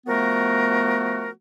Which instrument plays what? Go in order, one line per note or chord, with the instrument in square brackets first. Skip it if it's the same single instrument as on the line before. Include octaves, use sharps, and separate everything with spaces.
[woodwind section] F3 A3 B3 F#4 A#4